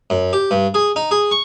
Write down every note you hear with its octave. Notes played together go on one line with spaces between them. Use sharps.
F#2
G4
G2
G#4
D#4
G#4
C#6